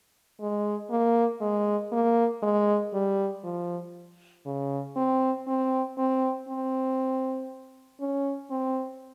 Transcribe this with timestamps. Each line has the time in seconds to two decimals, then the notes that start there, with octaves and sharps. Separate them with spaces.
0.40 G#3
0.90 A#3
1.41 G#3
1.92 A#3
2.43 G#3
2.94 G3
3.44 F3
4.46 C#3
4.96 C4
5.47 C4
5.98 C4
6.49 C4
8.00 C#4
8.51 C4